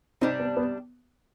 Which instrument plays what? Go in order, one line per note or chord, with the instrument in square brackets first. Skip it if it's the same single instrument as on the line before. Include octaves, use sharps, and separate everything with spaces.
[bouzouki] C3 G3 D4 [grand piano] C4 D#4
[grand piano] B3
B3